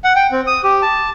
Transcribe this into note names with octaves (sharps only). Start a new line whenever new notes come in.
F#5
G5
C4
D#6
G4
A5